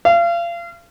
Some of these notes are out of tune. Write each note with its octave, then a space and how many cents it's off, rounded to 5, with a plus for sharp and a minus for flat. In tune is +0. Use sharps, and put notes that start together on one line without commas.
F5 -35